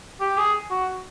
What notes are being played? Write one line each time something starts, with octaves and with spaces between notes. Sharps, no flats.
G4
G#4
F#4